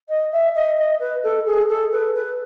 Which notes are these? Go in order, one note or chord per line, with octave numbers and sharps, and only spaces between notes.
D#5
E5
D#5
D#5
B4
A4
G#4
A4
B4
B4